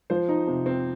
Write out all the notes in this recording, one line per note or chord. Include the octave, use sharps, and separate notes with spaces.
F3 C5
D#4
C3
C4